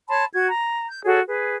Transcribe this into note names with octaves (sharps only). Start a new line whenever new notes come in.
C#5 A5 B5 C6
F#4 G#6
A#5
G6
F#4 G#4 A4 C#5
G#4 B4